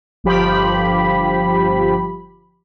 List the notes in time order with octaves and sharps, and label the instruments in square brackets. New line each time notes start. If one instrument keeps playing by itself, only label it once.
[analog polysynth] G1 F3 G4 B5